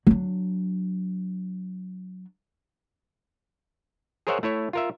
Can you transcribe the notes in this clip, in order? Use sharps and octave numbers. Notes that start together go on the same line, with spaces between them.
F#3 D4
G#4 A#4 C5 C#5 E5 F#5
A3 E4 C#5
F4 A#4 E5